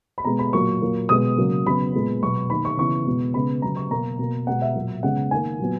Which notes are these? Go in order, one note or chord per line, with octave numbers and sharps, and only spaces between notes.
B5
B2 G#3 B3 A#5
B5
A#2 F#3 A#3 C#6
A#2 F#3 A#3
B2 G#3 B3 D#6
C#3 F#3 A#3
C#3 F#3 B3 B5
A#2 G#3 B3
B2 F#3 B3 C#6
D#3 A#3 B5
C#6
C#3 E3 B3 C#6
B2 G#3 B3
C#3 G#3 B3 B5
C#3 F#3 B3 A#5
C#6
B2 F#3 A#3 A#5
B2 A#3
B2 G#3 B3 F#5
E5
A#2 F#3 A#3
C#3 G#3 B3 F#5
D#3 A#3 G#5
A#2 F#3 B3